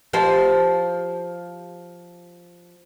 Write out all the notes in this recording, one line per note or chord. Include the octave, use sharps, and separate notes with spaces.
F3 G4 C5